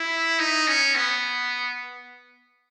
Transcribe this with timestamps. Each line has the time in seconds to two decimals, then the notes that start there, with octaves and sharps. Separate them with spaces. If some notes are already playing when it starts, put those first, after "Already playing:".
Already playing: E4
0.39 D#4
0.68 C#4
0.95 B3